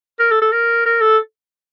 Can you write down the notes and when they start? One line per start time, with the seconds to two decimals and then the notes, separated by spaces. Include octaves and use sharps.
0.20 A#4
0.31 A4
0.42 A4
0.52 A#4
0.86 A#4
1.01 A4